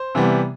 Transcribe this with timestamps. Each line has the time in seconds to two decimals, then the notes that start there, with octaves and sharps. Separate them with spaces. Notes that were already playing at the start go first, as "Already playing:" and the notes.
Already playing: C5
0.15 C3 E3 G3 B3